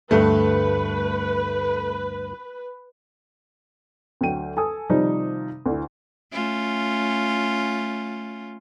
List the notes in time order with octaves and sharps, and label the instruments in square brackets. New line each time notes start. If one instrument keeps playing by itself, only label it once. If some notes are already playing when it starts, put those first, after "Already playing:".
[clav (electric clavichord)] D2 G2 [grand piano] A3 [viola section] B4
[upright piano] D2 F#3 G5 D#7
A4 G#5 D#6
C3 D#3 F3 G3 D#4
D2 E4
[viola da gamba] A3 C#4 F4